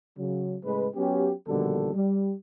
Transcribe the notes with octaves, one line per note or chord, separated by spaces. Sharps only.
C#3 F#3
A2 C#3 G#3 B4
F#3 B3 C#4 G4
A#1 B2 D3 D#3 G3 A4
G3